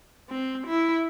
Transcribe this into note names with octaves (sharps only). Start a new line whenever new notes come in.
C4
E4